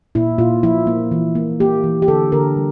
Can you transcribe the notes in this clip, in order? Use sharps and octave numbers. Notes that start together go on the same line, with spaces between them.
A#2 E4
A#2 F4
F3 E4
A#3
E3
A#3
A#3 G4
E3
G4
D3 A4
D3 A#4
G3